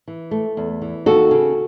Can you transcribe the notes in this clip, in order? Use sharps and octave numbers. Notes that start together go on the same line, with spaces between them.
E3
A3
E2
E3
D#2 F#4 A4
C#3